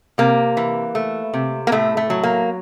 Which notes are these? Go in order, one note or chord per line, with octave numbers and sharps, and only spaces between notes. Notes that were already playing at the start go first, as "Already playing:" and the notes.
C3 A#3
E3
A3
C3
A#3
A2 A3
A3
F#3
A#3